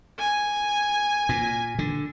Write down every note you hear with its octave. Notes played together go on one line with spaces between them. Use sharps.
G#5
A#2
D3